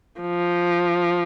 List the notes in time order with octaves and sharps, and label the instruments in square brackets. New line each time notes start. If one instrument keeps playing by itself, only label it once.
[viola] F3